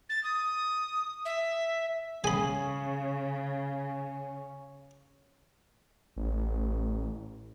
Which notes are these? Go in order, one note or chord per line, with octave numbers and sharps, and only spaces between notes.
A6
D#6
E5
C#3 C#4 G#4 G#5 B5
A1